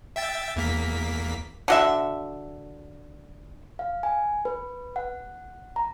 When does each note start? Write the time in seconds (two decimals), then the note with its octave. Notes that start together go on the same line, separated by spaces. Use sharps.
0.16 E5 G5 A6
0.56 E2 A#3 B6
1.68 D3 F#4 E5
3.79 F5
4.03 G#5
4.45 B4
4.96 F#5
5.76 A#5